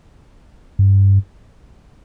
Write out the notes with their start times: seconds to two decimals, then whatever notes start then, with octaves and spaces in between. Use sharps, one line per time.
0.79 G2